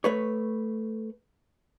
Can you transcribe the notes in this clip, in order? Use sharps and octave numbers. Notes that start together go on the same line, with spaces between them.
A3 B4 C#5